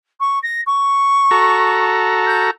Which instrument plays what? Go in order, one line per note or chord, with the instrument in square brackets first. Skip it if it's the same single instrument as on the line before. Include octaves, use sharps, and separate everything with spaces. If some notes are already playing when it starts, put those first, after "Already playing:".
[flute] C#6
A#6
C#6
[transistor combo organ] F#4 A4 A#5
[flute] G6